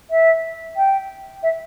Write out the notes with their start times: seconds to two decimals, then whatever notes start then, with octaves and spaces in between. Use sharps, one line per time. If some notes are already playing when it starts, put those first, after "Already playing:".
0.10 E5
0.76 G5
1.42 E5